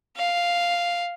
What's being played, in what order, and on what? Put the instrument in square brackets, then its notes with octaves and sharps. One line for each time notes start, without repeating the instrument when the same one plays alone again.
[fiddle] F5